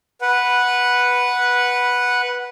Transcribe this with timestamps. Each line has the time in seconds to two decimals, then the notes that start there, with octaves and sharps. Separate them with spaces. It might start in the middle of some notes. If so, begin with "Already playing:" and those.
0.21 B4 F#5